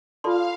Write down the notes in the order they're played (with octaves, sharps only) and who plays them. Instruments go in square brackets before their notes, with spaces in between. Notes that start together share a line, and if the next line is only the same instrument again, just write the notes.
[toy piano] F4 A4 D5 A5 C6 [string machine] F5